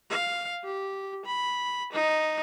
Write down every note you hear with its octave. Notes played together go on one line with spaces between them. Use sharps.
F5
G4
B5
D#4